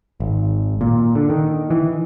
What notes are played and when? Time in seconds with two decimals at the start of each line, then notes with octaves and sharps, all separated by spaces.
0.20 G#1
0.81 A#2
1.15 D3
1.30 D#3
1.71 E3